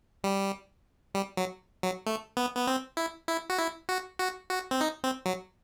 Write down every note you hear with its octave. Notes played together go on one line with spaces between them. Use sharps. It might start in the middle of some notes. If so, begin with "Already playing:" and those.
G3
G3
F#3
F#3
A3
B3
B3
C4
E4
E4
F#4
E4
F#4
F#4
F#4
C4
D#4
C4
F#3